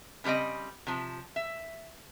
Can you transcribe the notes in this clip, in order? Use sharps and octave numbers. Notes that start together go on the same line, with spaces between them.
C#3 E3 G3 C4 D#5
C3 F3
E5